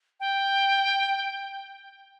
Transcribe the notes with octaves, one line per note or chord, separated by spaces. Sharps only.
G5